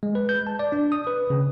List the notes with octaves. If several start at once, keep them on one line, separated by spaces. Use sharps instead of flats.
G#3
B4
G6
A5
D5
D4
D#6
B4
C#3